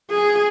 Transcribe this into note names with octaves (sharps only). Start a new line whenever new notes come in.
G#4